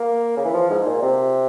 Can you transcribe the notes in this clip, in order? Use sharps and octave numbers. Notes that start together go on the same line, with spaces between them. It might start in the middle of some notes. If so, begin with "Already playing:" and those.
Already playing: A#3
C#3
E3
F3
G#2
A#2
C3